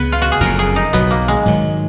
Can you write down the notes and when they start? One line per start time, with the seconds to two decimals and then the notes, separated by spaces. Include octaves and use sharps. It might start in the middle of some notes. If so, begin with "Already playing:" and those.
Already playing: C#2 C#3 B3 B4
0.12 F4
0.22 F#4
0.32 G#4
0.41 F#1 F2 C#3 A#4
0.59 G#4
0.76 D#4
0.93 B1 B2 F#3 B3
1.11 A#3
1.28 G#3
1.46 G#2 D#3 F#3